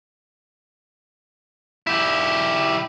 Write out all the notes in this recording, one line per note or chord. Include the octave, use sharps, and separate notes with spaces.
E4 G4